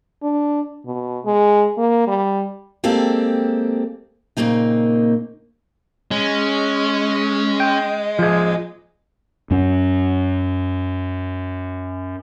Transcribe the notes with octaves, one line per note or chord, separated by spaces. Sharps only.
D4
B2
G#3
A#3
G3
G#3 A#3 C4 G4 A4 F5
A#2 C#3 A#3 C4 D#4
G#3 C#4
G5
F3 G#4
F#2 C#4